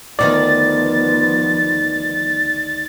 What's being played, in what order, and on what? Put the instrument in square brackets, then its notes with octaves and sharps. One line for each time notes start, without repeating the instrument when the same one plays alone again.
[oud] D2 D#3 D#4 [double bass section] F3 B3 [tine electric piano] D5 [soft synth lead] A6